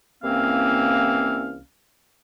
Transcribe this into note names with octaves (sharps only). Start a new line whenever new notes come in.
C2 E3 A#3 C4 C#4 F5